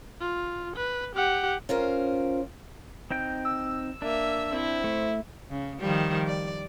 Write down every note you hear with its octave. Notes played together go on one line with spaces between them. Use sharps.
F4
B4
G4 F#5
C#4 F4 A#4 C5
C4 D#4 G5
E6
A#3 D4 E5
C4 E4
A3
C#3
D#3 F3 G3
D5